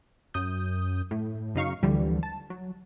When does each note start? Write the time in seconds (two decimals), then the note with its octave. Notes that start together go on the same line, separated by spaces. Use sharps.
0.34 F#2 D#6 G6
1.11 A2
1.55 F#2 C#3 D#4 F5 C#6
1.83 D2 D3 E3 F3 G3
2.23 A5
2.50 F#3